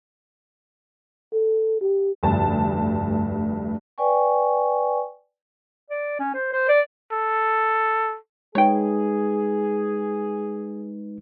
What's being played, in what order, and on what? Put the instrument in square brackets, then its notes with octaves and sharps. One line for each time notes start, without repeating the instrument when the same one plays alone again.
[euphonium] A4
G4
[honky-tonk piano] F1 D2 G2 A5
[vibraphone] B4 D5 G5 G#5 C#6
[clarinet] D5
C#4
C5
C5
D5
[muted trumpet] A4
[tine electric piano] G#3 D#4 B4 [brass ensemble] G#4 [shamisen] C#5 G5